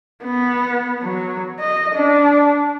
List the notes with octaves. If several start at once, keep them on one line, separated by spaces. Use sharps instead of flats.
B3
F#3
D#5
D4